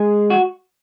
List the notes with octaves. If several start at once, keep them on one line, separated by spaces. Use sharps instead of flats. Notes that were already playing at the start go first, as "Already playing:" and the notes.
Already playing: G#3 G#4
F#4